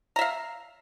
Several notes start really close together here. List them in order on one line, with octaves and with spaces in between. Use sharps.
A#5 E5 F5